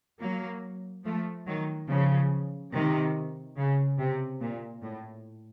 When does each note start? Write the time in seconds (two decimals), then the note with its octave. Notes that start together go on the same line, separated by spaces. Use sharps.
0.21 F#3 A#3
1.05 F3 A3
1.46 D#3 F#3
1.89 C#3 F3
2.73 C3 D#3
3.57 C#3
3.98 C3
4.41 A#2
4.82 A2